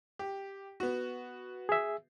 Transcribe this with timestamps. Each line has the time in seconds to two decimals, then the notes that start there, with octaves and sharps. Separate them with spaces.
0.19 G4
0.80 B3 F#4
1.69 G#4 E5